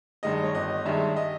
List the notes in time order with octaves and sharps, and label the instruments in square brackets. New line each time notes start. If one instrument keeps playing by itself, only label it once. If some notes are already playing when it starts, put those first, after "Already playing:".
[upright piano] G2 D#3 G#3 D#5
C#5
G1 D#5
G2 D#3 G#3 E5
D#5